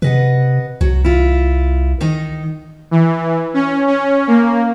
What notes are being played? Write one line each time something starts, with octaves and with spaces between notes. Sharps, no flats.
C3 B4 D#5 F#5
C2 F#3
E4 F4
D#3 D#4
E3
C#4
C#4
A#3